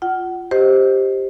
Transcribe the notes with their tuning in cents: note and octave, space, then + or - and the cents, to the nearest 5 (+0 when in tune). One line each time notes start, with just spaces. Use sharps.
F4 +0 F#5 +25
G4 +0 C5 +0 D#5 +0